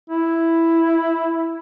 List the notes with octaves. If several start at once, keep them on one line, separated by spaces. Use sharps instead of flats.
E4